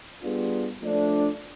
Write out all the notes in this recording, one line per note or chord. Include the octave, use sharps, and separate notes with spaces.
G3 B3 D4 F4 G#4
F3 A3 D4